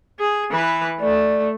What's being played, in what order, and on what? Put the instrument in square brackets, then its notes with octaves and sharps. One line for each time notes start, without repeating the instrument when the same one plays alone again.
[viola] G#4
E3 B4
[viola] A3 [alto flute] D5